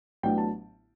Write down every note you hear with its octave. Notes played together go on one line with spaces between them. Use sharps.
A1 A2 F#3 B3 D4 G5
A5